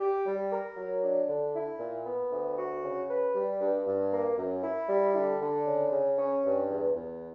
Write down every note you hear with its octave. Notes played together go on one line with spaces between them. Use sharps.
G4
G3
A#4
F#3
D4
D3
E4
A#2
B3
D2
F#4
C#3
B4
G3
G2
G2
A#3
F#2
E4
G3
D3
D3
C#3
C#3
C#4
G2
E2
E2